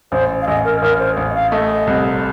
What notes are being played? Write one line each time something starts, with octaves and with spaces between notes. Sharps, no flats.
A1 C5
F5
A1 D#5
A#4
A1 A#4
C5
A1
D#5
F5
A3 D#5
C2